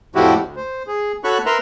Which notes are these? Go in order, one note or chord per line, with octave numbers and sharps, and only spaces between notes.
F2 A2 F3 E4 F#4 G4
D2
C5
G#4
F#4 A4 C#5 B5 C#6 F#6
A#4 B4 E5 A#5 C6